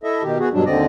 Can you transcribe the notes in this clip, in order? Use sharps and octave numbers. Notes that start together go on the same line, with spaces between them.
E4 A4 D#5 E5
B2 D#3 G4
B3 F#4 G#4
G2 B2 F#3 G3 D4
D#2 D3 C4 D5 D#5